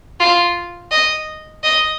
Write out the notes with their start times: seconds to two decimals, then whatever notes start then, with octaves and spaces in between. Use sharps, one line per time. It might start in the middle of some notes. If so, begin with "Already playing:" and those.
0.20 F4
0.91 D#5
1.63 D#5